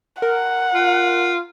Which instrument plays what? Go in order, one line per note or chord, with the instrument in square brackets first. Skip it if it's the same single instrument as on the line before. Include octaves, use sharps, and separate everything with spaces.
[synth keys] A#4 [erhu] F#5
[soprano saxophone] F4